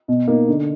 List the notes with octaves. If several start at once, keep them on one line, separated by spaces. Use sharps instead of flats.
B2
A#3 D#4
D3